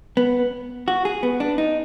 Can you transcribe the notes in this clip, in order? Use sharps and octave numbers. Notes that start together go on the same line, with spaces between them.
B3
F#4
G#4
B3
D4
D#4